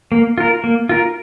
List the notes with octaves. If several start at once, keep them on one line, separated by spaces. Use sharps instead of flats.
A#3
F4 A#4
A#3
F4 A#4